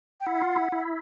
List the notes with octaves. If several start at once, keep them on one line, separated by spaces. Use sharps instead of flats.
G5
E4 F#5
F4
E4
E4